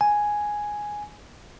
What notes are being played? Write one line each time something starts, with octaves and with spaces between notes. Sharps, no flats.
G#5